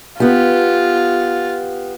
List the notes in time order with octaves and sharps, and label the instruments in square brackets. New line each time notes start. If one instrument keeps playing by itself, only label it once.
[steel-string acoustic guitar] B3 G4 [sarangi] F4